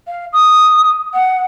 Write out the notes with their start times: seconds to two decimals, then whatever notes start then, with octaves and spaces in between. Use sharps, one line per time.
0.08 F5
0.33 D#6
1.14 F#5